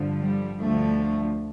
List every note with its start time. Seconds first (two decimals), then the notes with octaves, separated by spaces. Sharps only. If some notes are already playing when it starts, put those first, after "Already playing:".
Already playing: G2 D3 F3
0.18 G3
0.59 D2 D3 F3 A3